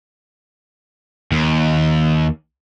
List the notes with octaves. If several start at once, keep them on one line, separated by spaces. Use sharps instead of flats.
D#2